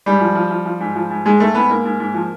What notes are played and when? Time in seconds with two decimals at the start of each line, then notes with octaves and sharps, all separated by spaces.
0.06 G#2 G3
0.21 F3
0.35 F3
0.51 F3
0.66 F3
0.80 G#2
0.96 F3
1.10 G#2
1.25 G#2 G#3
1.40 G#2 A3
1.55 G#2 B3
1.70 G#2 A#3
1.85 G#2
2.00 G#2
2.14 F3